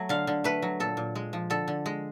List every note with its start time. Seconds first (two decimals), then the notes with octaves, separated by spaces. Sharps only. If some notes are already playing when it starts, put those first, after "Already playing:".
Already playing: F#3 A3
0.09 D3 F5
0.27 D3
0.44 A3 B4
0.62 F#3
0.80 A#2 A4
0.97 A#2
1.15 G#3
1.33 F3
1.50 D3 A4
1.68 D3
1.86 G#3